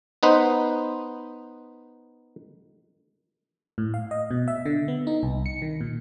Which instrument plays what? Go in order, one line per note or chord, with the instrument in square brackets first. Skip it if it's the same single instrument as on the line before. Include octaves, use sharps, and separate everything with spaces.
[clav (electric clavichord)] B3 D#4 B4 C5
[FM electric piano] A2
F5
D#5
B2
E5
D3
B3
D#4
C2
C#7
D#3
A#2